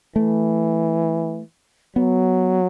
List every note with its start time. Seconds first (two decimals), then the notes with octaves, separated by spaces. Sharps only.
0.16 E3 A3
1.96 F#3 B3